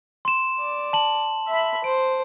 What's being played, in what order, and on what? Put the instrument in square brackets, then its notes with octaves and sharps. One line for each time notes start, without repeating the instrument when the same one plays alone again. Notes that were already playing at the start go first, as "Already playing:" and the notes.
[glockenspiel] C6 E7
[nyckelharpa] D5
[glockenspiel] A5 F#7
[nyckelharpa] E5 B5
[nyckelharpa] C5 [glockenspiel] D7